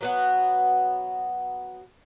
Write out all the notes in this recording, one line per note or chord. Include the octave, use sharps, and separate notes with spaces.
F#3 B3 F#4